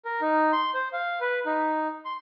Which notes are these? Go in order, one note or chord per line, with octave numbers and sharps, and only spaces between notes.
A#4
D#4
C6
C5
F5
B4
D#4
C6